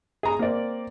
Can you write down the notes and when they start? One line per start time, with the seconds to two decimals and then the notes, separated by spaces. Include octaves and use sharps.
0.23 G#4 A#5
0.39 A#3 C4 D5